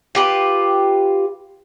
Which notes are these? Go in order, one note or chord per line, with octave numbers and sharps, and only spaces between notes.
F4 G4 B4